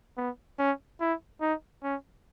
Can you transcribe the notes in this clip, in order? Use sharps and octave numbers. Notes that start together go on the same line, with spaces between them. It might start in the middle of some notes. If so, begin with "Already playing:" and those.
B3
C#4
E4
D#4
C#4